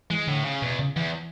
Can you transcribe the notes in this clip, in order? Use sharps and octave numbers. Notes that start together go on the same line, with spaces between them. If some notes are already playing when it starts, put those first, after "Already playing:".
E3 G#3
A2 D3
C#3
E2 B2
C#3
E2 E3